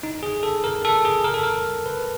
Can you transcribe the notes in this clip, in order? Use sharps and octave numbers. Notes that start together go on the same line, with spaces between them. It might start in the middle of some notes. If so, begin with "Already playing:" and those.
D#4
G#4
A4
A#4
A4
G#4
A#4
A4
A#4
B4